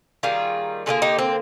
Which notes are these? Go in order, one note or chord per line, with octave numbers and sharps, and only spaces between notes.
D#3 G3 A#3 F4 G#4
D3 G3 A#3 F4 G#4
D#4 G4
C4